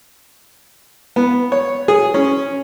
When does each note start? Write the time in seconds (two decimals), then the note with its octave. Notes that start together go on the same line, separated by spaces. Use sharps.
1.16 B3
1.52 C#5
1.88 G#4
2.14 C#4